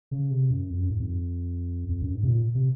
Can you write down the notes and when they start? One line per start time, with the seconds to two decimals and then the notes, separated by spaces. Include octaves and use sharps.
0.11 C#3
0.31 C3
0.51 F#2
0.70 F2
0.80 F#2
0.90 G#2
1.00 F2
1.89 F2
2.02 F#2
2.15 G#2
2.23 C3
2.28 A#2
2.55 C3